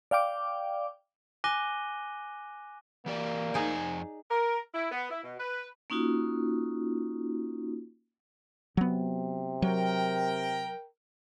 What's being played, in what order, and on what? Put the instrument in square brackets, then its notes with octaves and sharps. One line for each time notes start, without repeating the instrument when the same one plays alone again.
[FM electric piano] D5 F5 G5 D6
[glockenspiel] G#5 D6 F#6 A#6 D#7 G7
[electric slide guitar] E3 G4 D5 [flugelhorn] A#3
[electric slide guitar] F2 C5 G#5 [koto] D#4 G#4 D5
[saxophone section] A#4
E4
B3
E4
B2
B4
[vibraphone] A#3 C#4 D#4 F4 F#4
[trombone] C3 [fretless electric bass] F#3 B3
[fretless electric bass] F#3 [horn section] A#4 G5